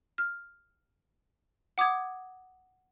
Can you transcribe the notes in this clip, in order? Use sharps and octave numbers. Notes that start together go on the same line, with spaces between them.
F6
F#5 D6 D#6 G#6